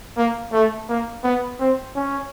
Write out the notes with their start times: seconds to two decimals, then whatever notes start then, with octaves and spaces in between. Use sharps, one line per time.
0.17 A#3
0.53 A3
0.89 A#3
1.24 B3
1.60 C4
1.96 C#4